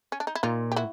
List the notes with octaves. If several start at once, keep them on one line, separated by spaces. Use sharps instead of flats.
C#4
D4
D#4
E4
A#2 D#4 F4
G4
E4 F#4